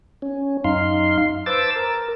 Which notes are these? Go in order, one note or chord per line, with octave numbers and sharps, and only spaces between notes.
C#4
F#2 D#4 F5 C6
B4 C5 A5 D6 E6 A6
A#4